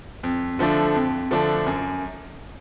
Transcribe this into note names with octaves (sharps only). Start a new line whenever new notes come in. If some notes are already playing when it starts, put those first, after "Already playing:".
F2
D3 F3 A3 D4
F2
D3 F3 A3 D4
F#2